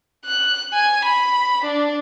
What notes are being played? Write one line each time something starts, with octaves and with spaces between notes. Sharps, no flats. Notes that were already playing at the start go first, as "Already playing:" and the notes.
F#6
G#5
B5
D4